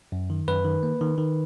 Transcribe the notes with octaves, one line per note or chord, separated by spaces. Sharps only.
F#2
D#3
F#2 B4
D#3
A#3
D#3
D#3